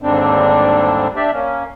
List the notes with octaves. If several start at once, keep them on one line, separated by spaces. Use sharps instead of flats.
D#2 G#2 D3 G3 C4 D4
D4 G4 D5 E5
A#3 C#4